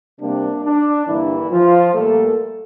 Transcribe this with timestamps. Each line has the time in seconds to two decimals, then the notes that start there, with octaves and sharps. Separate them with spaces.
0.20 C3 G3 A#3 D4
0.63 D4
1.07 G2 D3 E3 G3 A#3 E4
1.51 F3 F4
1.94 A#2 G3 A3 A#3 A4